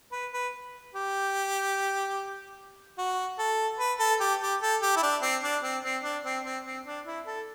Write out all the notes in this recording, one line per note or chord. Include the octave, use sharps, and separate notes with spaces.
B4
B4
G4
F#4
A4
B4
A4
G4
G4
A4
G4
E4
D4
C4
D4
C4
C4
D4
C4
C4
C4
D4
E4
A4